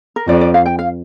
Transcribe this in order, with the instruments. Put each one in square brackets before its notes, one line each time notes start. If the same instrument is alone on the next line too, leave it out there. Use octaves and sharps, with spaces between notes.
[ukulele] A#4
[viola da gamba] F2 [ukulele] D5
[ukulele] D5
F5
G5
F5